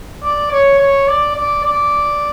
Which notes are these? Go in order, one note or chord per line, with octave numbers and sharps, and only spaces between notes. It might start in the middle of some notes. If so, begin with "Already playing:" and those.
D5
C#5
C#5
D5
D5
D5